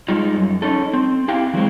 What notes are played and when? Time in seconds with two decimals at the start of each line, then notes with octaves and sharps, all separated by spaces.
0.08 G3 G#3 D#4 F4
0.36 F#2
0.62 C#4 D#4 A4
0.94 C4
1.28 E4 G4 F5 G5
1.54 E3 F#3 G#3 C4